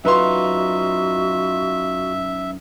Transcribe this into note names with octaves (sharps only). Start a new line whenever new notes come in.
F#2 D#4 F4 F#4 B4 E5 C6